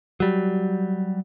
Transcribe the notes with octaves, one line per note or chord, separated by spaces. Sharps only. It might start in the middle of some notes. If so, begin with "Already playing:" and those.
F#3 G3